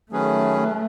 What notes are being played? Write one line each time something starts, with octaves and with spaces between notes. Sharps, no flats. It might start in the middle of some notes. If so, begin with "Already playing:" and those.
D#3 F#3 A3 C#4 G#4 B4